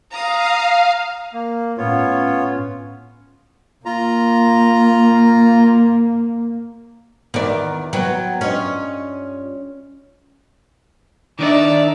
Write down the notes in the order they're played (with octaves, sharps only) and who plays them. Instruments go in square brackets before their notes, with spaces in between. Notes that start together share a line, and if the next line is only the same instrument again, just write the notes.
[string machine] F5 [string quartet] A#5 D#6
[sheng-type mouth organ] A#3
[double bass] A2 C#4 [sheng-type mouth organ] B3 F4 C#5
[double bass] A#3 [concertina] F4 A#5
[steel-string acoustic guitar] E2 B3 [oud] D#3 D5
[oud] F#3 [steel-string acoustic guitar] B3 B4 G5
[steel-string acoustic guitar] G2 F4 D#5 [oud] C#4
[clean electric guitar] D#3 D4 D#4 [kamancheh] D5 E5